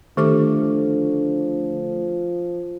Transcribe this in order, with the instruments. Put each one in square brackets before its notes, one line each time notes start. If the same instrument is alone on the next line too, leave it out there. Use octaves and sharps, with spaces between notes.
[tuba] D3 [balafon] D#3 G4 D6 [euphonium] F3 [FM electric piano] A3